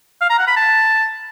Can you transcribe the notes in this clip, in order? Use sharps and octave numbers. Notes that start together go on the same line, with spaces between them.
F5
A#5
F#5
B5
A5